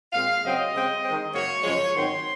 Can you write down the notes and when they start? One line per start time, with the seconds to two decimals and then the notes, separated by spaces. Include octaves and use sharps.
0.12 A#2 G#3 C4 F5
0.42 F#2 C#3 F#3 C4 D#5
0.72 C#3 G#3 C4
1.02 D#3 G#3 C4
1.32 F#2 C#3 F#3 A#3 C#5
1.62 F#2 C#3 F3 G#3 C#5
1.93 G#2 D#3 F#3 C4 C6